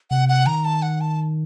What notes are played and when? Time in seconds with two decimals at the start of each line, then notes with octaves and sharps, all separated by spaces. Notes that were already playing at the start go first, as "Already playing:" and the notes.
0.11 C3 F#5
0.29 F#5
0.46 D#3 A#5
0.65 A5
0.82 F#5
1.01 A5